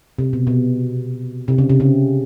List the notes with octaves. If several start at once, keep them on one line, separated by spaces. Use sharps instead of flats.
C3
B2
B2
C3
C#3
C3
C#3